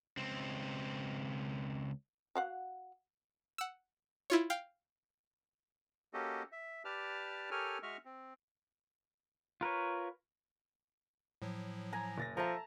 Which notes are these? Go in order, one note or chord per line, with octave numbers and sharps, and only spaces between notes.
C#2 C4
F#4 F5 F#5
F#5 E6
E4 F4 C#5
F5 G5
A#3 C#4 F#4 G4 A4 D#5
E5
G4 B4 D5 A5 F6
G4 A4 A#4 C#5 G#5 F6
G#3 F#4 D#5 E5 C#6 F6
C4
F4 A#4 B4 C#5
A2 F3 F#3
G#5 A#5
F#1 A6 A#6
F3 A4 E5 A5 A#5